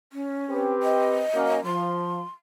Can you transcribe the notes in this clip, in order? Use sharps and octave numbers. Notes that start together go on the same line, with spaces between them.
C#4
C4 G4 B4
D#5
F#3 A#3 C#4
F3 C6